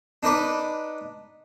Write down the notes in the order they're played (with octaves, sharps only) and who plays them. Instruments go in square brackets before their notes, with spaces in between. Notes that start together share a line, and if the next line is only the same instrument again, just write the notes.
[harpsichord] D4 D#4 B4 D6